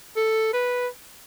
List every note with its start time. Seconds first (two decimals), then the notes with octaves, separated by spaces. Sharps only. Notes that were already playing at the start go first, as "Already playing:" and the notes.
0.16 A4
0.53 B4